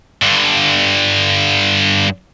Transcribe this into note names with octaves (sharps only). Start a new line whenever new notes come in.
G2 D3